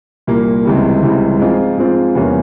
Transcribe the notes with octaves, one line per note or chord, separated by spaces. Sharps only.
C2 A#2 G3 A#3
C#2 C3 E3 G3
C#2 C3 E3 G3
G#2 F3 G#3 C4 F4
G#2 F3 G#3 C4 F4
E2 C3 G3 A#3 C#4